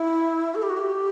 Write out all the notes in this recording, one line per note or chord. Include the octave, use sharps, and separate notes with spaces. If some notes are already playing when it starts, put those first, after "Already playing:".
Already playing: E4
A4
G4
F#4
G4